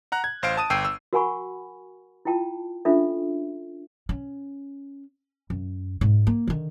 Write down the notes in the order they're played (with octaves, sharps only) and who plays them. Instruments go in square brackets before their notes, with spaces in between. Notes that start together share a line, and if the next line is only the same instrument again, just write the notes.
[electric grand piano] F#5 A#5 F#6
G#6
A1 C5 F5 D7
A5 D#6 D#7
G1 G5 E6 C7 D#7
E6
[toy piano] F#4 A#4 F#5 G#5 B5 C#6
E4 F4 G5 A5
C#4 D4 F4 A4 E5
[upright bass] C#4
F#2
G#2
A#3
D3 D#3